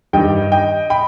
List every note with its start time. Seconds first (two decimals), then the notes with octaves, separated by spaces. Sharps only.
0.13 G2 D#3 G3 D#5 G5
0.52 D#5 G5
0.90 G5 B5